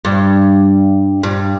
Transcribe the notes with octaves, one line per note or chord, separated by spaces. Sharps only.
G2
G2